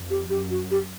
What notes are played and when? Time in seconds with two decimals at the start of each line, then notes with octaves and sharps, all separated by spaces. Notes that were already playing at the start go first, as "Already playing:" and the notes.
Already playing: F2
0.10 G4
0.30 F#2 G4
0.50 F#4
0.71 G4